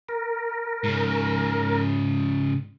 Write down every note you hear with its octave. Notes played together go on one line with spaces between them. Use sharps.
A#4
G#2 C#3